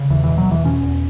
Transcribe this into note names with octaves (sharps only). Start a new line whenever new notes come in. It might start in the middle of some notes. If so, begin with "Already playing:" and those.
Already playing: C#3
E2 E3
E3
B2
F#3
E2 E3
B2 C#4
E2